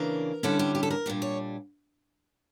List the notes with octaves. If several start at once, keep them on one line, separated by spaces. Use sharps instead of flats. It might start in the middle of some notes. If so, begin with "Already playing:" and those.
Already playing: C#3 E3 A#3 D4 A#4
D3 G3 C#4 E4 A4
G4
G4
A4
A#4
A#2 G3 D4
C#5